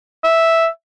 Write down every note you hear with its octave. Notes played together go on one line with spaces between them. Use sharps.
E5